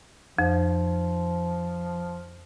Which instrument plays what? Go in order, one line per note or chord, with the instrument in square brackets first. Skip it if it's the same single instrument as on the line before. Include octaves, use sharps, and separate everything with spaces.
[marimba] F2 [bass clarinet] F3